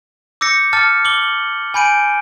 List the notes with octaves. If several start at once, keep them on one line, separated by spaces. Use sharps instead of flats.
D6 E6 G6 A#6 C#7
A5 D6 F6 A6 C#7
D6 F#7 G7
G#5 B5 G6 D7 D#7